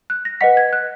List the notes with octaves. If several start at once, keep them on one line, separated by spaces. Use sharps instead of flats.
F#6
A#6
B4 D#5 F#5 B6
G#6
F#6